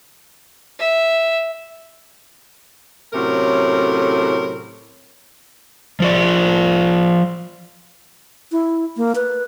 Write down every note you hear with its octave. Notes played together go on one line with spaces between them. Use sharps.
E5
A2 C3 F#3 A3 C#4 A#4
F3 F4 D5
E4
A#3
B4